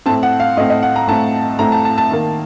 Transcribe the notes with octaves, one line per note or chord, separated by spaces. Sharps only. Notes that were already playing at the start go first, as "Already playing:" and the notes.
A2 A3 C4 A5
F#5
F5
A2 A3 C4 D#5
D#5
F#5
A#5
A2 A3 C4 A5
A2 A3 C4 A#5
A5
A5
A5
D#3 A#3